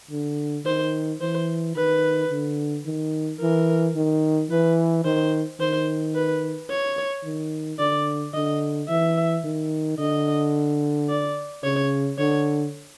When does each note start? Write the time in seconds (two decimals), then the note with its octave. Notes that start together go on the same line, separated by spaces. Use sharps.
0.11 D3
0.65 D#3 C5
1.21 E3 C5
1.75 D#3 B4
2.31 D3
2.86 D#3
3.40 E3 A#4
3.96 D#3
4.51 E3 B4
5.05 D#3 C5
5.60 D#3 C5
6.15 B4
6.70 C#5
7.25 D#3
7.79 D3 D5
8.34 D3 D#5
8.89 E3 E5
9.44 D#3
9.99 D3 D#5
11.09 D5
11.64 C#3 C#5
12.18 D3 C#5